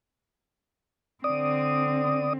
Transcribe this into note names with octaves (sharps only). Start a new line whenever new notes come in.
D3 C4 D5 D#6